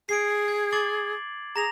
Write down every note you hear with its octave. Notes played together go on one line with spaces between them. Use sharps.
G#4 C7 D7
G#6
D6 A6 F#7
G#4 A#5 A#6 F7